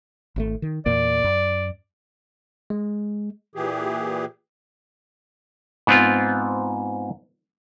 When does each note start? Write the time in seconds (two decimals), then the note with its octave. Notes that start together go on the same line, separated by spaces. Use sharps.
0.36 G#1 B2 A3
0.62 D#3
0.86 E2 A#2 A#3 D5
1.24 F#2
2.70 G#3
3.55 A#2 E3 G4 G#4
5.87 G#2 B3 C4 F4